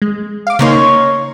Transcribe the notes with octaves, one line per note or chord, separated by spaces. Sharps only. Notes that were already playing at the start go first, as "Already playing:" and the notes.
G#3
F5 D6
C#3 A#3 C#4 D#4 C#5 C6